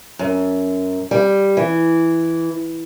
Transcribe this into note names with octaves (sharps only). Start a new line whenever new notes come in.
F#2
G3
E3